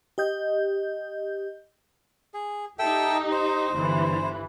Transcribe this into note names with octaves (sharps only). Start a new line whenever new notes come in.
G4 D#5 G6
G#4
D#4 G4 A4 E5 G5
C5
G1 E3